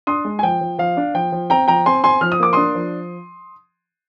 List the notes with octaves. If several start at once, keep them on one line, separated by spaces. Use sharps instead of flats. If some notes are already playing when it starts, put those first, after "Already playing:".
D4 C6 D#6
G#3
G#5
F3 G5
F3
F3 F5
D4
F3 G5
F3
C4 G5 A#5
F3 G5 A#5
C4 G#5 C6
C4 G#5 C6
F3 F6
D#6
A#3 D6
D4 C6 D#6
F3